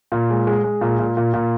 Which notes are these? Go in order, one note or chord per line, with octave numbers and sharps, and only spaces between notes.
A#2
G#3
G#3
G#3
A#2
A#2
A#2
A#2